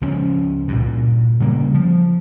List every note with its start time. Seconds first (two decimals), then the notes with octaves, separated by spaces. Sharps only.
0.01 C#2 F3 C#4
0.68 G2 A#2
1.40 C#3 G3 A#3
1.75 F3